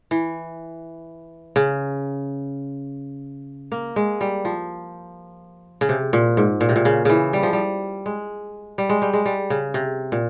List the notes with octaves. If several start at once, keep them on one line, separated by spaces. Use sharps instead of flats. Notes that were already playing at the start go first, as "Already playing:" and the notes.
E3
C#3
A#3
G#3
G3
F3
C#3
C3
A#2
G#2
A#2
C3
A#2
C#3
C#3 E3
G3
F3
G3
G#3
G3
G#3
G3
G#3
G3
C#3
C3
A#2